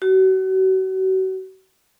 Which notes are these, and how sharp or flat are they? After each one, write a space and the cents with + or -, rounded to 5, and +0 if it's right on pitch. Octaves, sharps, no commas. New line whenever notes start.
F#4 +35